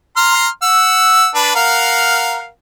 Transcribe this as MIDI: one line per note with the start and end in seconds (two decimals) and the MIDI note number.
0.17 0.48 82
0.17 0.48 84
0.17 0.48 89
0.62 1.29 78
0.62 1.29 88
1.35 1.51 62
1.35 1.51 71
1.55 2.48 70
1.55 2.48 77
1.55 2.48 78